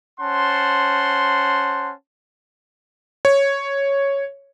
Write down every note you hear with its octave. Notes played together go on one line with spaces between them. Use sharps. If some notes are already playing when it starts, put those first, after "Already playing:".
C#4 C5 F#5 A5 C6
C#5